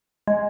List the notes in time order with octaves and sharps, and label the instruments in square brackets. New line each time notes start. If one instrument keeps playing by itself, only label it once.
[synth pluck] G#3